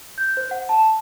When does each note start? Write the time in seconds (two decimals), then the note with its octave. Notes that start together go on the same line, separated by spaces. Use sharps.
0.18 G6
0.37 C5
0.51 F#5
0.69 A5